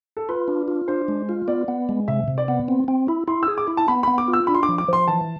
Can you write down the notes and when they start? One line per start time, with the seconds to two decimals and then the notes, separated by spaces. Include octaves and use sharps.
0.17 A4
0.29 F4 B4
0.48 D4
0.68 F4
0.88 D4 C5
1.08 G#3
1.29 F4
1.48 B3 D5
1.68 B3
1.89 G#3
2.08 C3 E5
2.28 C3
2.38 D5
2.48 B3
2.68 C4
2.88 C4
3.08 E4
3.28 E4 C6
3.43 E6
3.48 G#4
3.58 D6
3.68 E4
3.77 A5
3.88 B3 B5
4.03 B3 B5
4.18 D6
4.28 F4
4.33 E6
4.47 D4 B5
4.54 C6
4.63 D6
4.69 F3
4.78 D6
4.89 F3 C6
5.08 E3 A5